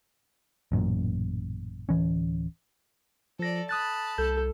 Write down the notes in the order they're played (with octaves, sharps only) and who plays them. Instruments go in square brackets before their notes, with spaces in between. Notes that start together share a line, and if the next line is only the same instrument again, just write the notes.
[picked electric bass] A1 F#2 A#2
D1 E3 C#4
[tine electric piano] F3 A#6 [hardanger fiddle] A4 D5
[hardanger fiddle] A5 B5 [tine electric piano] D#6 F#6 A6
[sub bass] C2 [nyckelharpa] A4 [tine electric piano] G6